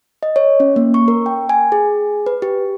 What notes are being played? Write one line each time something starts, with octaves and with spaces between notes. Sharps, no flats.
D#5
C#5
C#4
A#3
C#6
A#4
G5
G#5
G#4
B4
G4